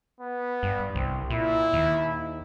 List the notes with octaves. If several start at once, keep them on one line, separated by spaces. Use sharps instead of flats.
B3
G2
C2 C4
A#2 E4
D#2